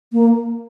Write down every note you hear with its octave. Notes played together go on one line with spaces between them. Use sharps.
A#3